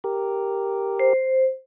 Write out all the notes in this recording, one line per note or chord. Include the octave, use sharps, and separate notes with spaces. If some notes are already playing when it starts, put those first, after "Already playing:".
G4 A#4
C5